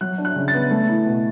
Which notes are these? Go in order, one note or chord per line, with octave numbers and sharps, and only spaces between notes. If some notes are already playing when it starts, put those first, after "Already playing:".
F#3 F#6
D4
F#6
C#3
A6
B3
A3
E4
B2